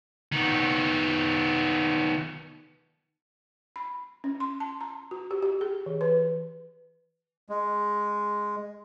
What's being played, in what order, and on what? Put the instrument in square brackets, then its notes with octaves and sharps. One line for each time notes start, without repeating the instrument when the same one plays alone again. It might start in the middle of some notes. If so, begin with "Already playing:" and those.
[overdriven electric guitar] D#3 B3
[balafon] B5
C#4
C6
A5
A#5
F#4
G4
G4
G#4
E3
B4
[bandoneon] G#3